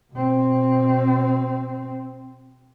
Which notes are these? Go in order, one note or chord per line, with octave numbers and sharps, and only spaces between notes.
B2 C4